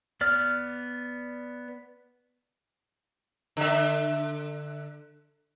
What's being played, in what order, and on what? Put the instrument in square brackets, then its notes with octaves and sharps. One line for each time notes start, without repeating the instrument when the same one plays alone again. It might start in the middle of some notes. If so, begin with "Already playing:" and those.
[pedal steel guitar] B3 D5 F6
[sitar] D3 E5